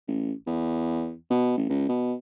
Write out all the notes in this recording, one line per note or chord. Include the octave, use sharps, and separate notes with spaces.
A1
E2
B2
A1
C#2
B2